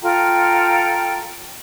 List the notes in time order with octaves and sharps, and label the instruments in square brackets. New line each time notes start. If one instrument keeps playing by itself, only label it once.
[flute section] F4 A4 G5 A#5